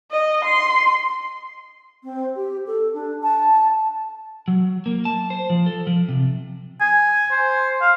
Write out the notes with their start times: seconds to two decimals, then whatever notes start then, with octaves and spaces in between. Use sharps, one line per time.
0.11 D#5
0.45 C6
2.04 C4
2.36 G4
2.67 A4
2.94 D4
3.23 A5
4.48 F#3
4.86 A#3
5.05 A5
5.30 C5
5.50 F3
5.66 A4
5.87 F3
6.09 C3
6.81 G#5
7.32 C5
7.81 F5